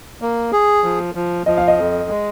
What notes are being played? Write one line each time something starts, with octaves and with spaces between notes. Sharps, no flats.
A#3
G#4
F3
F3
F3 D#5
F5
D#5
F2
G#3